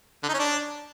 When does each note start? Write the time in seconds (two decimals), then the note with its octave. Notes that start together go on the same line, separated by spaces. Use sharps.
0.23 D3
0.29 D#4
0.34 C#4
0.39 D4